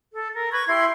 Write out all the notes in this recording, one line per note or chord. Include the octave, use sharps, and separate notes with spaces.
A4
A#4
B4 C#6 G#6
E4 G4 C6 G#6